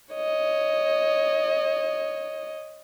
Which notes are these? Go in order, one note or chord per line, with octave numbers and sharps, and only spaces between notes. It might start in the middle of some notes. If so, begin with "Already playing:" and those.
C#5 D#5